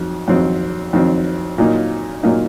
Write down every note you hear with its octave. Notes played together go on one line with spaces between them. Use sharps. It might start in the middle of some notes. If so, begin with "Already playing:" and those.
Already playing: F2 D#3 F#3
F2 D#3 F#3 C4
F2 D#3 F#3 C4
A#2 F#3 A#3 D#4
A#2 F#3 A#3 D#4